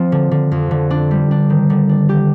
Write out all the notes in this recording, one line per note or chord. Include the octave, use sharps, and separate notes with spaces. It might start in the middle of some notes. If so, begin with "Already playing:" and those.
Already playing: F3 C4
D3
D3
F2
D3
D4
G3
D4
D#3
D3
D4
G4